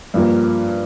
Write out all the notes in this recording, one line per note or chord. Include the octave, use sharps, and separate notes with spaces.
G2 F3 A#3